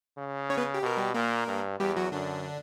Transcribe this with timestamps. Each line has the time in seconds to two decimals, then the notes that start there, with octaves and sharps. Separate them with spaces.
0.17 C#3
0.50 C#4 C#5
0.57 B3 B4
0.74 G4
0.82 B2 A#4
0.97 G3 G4
1.14 A#2 A#3 A#4
1.47 G2
1.80 E2 G3 G4
1.96 F#3 F#4
2.12 F#2 D3 D4